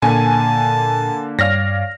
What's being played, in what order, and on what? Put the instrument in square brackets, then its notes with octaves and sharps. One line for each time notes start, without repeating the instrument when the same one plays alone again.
[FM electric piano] A#2 [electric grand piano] D3 A#3 [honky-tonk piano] G#5 [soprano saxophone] A5
[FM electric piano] G2 [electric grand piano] C#5 D5 F5 [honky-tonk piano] F6 A#6